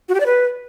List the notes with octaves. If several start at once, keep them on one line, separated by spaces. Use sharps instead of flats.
F#4
G4
D5
B4